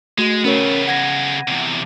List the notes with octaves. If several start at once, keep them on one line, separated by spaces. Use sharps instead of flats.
G#3 A3 F#4
C#3 B3 C#4 A#4 C#5
F#5 G#6 A#6
E2 C3